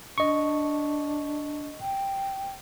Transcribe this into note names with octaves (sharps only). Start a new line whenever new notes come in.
D4 D#5 C#6
G5